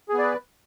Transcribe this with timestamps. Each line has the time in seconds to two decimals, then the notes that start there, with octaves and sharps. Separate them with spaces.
0.09 G#4
0.14 B3
0.18 D5
0.23 B4